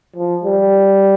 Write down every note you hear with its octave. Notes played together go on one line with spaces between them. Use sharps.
F3
G3